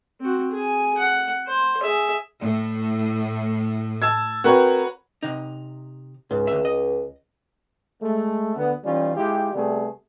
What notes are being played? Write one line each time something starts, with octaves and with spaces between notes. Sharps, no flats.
C4 F#4
G#4 G#5
F#5
C5
G#4 E5
A2
A5 E6 G#6
C4 F#4 A#4 B4 C#5
C3 D#4
C#2 G#2
D2 E5
D#5
G#3 A3
D2 B3
E3 G3 C#4 D#4 F4
G#3 E4 F4 G4
C3 G3 A3 B3 G#4